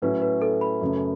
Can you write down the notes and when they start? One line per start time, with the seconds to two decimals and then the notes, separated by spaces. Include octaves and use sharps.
0.02 A2 F#3 C#4 E4 B4
0.22 B4
0.42 A4
0.61 B5
0.81 F#2 C#3 A3